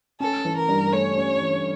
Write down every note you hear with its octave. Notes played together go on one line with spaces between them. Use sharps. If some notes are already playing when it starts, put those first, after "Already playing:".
C#4 A4
E3
A#4
G2
A3 C#5
C#4
E3